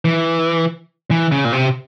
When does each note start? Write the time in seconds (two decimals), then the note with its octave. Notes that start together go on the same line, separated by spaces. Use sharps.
0.05 E3
1.11 E3
1.32 C#3
1.45 A#2
1.53 C3